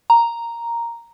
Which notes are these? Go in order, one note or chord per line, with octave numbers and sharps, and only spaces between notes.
A#5